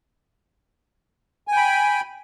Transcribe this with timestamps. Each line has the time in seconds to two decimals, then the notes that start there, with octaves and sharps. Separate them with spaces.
1.48 G#5
1.52 G5
1.57 B5